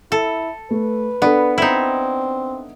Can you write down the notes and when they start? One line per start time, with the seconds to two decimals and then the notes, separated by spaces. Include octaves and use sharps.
0.12 E4 A4
0.71 A3 B4
1.22 B3 D4 A4
1.58 C4 D#4 E4